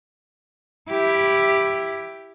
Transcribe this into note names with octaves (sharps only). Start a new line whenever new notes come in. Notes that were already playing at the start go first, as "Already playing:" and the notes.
E4 G4